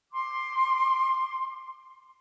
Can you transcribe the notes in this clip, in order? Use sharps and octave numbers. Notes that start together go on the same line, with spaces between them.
C6 D6